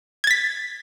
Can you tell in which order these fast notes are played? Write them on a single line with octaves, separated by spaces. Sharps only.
G#6 A6 B6